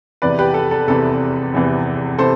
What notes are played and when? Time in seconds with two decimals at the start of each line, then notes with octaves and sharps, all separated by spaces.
0.22 F1 E2 C3 E3 B4 D5
0.39 G4 B4
0.54 A4
0.71 A4
0.87 F1 E2 C3 E3 A4
1.53 F1 E2 C3 E3
2.18 C3 E3 A4 C5